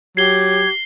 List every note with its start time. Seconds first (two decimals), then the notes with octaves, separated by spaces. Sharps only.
0.17 F#3 G4 G#6 C7 G7